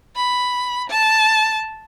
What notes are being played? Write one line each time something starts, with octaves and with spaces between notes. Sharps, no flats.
B5
A5